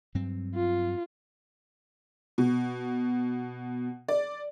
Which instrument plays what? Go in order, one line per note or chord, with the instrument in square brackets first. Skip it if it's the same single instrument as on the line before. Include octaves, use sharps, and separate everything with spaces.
[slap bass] G2 F#3 C4
[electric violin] F4
[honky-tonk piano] B2
D5